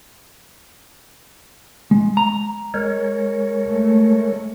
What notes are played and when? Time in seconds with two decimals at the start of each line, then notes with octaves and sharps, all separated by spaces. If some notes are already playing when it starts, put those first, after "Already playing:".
1.91 G#3
2.17 A#5
2.74 G#3 A#4 C#5
3.68 A3